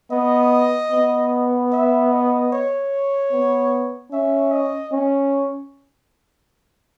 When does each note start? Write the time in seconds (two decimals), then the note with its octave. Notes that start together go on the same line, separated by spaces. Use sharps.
0.12 B3 D#5
0.92 B3
1.72 E5
2.12 D#5
2.52 C#5
3.32 B3
4.12 C#4 E5
4.52 D#5
4.92 C#4